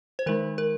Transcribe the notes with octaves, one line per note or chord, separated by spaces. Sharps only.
C5
D#3 G#3 D#4 A#4
A#4